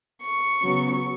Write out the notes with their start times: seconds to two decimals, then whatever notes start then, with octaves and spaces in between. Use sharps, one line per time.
0.22 C#6
0.61 C#3 F#3 B3